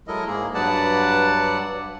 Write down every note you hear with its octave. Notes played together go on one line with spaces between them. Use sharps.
F#3 G#3 E4 A4 A#4 D#5
G#2 G#3 A#3 G#4
G2 F#3 B4 D5 F#5 A5